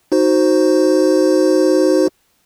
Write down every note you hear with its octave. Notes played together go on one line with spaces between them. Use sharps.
D#4 F#4 C5